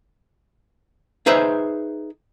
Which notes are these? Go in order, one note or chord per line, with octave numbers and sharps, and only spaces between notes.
D#4 G#4 B4 C5 E5